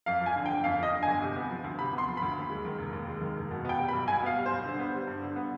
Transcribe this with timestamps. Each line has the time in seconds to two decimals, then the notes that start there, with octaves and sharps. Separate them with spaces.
0.06 F2 F5
0.21 F3
0.26 G#5
0.36 D3
0.46 G5
0.50 G1
0.64 F2 F5
0.79 F3 D#5
0.93 D3
1.03 G#5
1.08 G1
1.22 C3
1.36 B3
1.51 F3
1.64 D2
1.78 C3 B5
1.93 B3 C6
2.07 F3
2.17 B5
2.22 D2
2.37 D#2
2.50 G#3
2.65 D#3
2.79 F1
2.93 D#2
3.08 G#3
3.21 D#3
3.36 F1
3.51 B2
3.65 B3 G5
3.80 G3
3.88 B5
3.93 B1
4.08 B2 G#5
4.23 B3 F5
4.37 G3
4.46 B1 C5
4.66 D3
4.79 B3
4.94 G3
5.07 G2
5.23 D3
5.36 B3